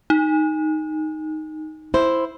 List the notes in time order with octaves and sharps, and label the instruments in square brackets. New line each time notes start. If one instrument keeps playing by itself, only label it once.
[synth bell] D#4
[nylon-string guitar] E4 C5